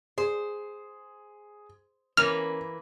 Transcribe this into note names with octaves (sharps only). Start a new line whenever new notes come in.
G#4 C5
E3 A#3 C#4 A#4 B4 F6